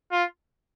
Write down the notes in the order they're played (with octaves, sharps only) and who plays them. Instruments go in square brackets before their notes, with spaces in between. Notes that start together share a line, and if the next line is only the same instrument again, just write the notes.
[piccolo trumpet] F4